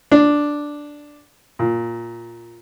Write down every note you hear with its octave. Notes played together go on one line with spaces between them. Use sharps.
D4
A#2